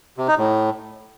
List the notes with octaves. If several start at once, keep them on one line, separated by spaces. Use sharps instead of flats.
C3
D#4
A2